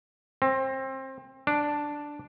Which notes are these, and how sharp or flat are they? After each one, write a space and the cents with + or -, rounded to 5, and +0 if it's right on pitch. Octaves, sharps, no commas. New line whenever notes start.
C4 +25
D4 +0